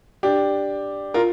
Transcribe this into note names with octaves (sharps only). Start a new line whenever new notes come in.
D4 G4
F4 A#4